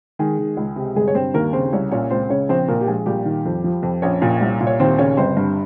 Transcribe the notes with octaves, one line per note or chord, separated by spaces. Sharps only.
D#3 G#3 G#4
D#3
C#2
C3
G1 G#3 G#4
C#5
G2 C4 C5
D#2 A#3 A#4
C#3 C4 C5
C2 C#4 C#5
A#2 C#4 C#5
C#2 C4 C5
C#3 C#4 C#5
A#1 C4 C5
A#2 A#3 A#4
G4
A#1 G#3 G#4
A#2 G3 G4
D#3
F2
F3
F2
A#1 C#4 C#5
A#2
C2
A#2
C#5
D#2 C4 C5
C#3 C#4 C#5
G1 C4 C5
G2